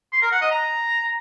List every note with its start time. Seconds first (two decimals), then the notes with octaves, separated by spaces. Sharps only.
0.12 C6
0.22 A#4
0.31 F#5
0.41 D#5
0.51 A#5